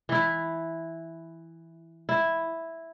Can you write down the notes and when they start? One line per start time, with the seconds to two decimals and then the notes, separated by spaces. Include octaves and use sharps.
0.09 E3 E4
2.09 E4